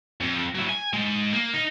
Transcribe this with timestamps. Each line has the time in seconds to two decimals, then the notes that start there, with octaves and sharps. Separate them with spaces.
0.21 F2
0.55 F#3 E4
0.70 G#5
0.94 G#2 G#3
1.33 A#3
1.54 D#4